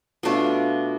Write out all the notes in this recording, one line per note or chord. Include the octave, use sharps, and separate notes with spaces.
B2 A3 D4 F4